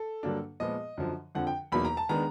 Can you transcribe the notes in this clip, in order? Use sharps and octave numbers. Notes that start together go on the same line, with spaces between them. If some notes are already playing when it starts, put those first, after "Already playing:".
Already playing: A4
G2 D3 F#3 A#3 D4
A#2 F3 G#3 B3 D#5
F#2 D3 F3
F2 D3 F3 F#5
G5
E2 B2 F#3 A#3 D#4 B5
A#5
A5
D#3 G#3 B3 D4 A#5